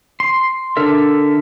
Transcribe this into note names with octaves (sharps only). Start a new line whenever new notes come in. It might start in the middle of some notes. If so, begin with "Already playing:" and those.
C6
D3 D4 A4 A#4 E5